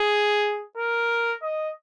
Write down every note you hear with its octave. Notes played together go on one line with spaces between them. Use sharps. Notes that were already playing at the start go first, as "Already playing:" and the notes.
Already playing: G#4
A#4
D#5